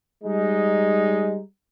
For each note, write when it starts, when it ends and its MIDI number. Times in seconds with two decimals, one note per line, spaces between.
0.24 1.39 55
0.24 1.39 56
0.24 1.39 63